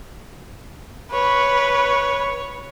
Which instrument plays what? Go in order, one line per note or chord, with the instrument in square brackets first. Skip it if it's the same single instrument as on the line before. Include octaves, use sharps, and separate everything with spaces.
[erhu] B4 [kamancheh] C#5